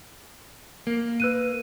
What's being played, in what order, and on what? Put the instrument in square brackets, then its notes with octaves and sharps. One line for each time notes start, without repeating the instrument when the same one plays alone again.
[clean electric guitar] A#3
[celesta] B4 F#6 D#7